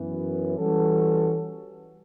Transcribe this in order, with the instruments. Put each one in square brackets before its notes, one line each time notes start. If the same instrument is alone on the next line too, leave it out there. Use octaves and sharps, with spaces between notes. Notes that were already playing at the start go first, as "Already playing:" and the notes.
Already playing: [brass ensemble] F#2 E3 B3
E3 G3 C#4 F#4 A4